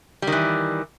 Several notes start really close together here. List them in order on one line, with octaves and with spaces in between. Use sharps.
G3 D#3 E3